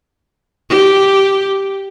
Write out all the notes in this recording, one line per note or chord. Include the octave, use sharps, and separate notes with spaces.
G4